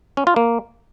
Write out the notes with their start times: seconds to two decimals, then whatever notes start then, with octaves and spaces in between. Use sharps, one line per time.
0.17 C#4
0.27 F4
0.36 A#3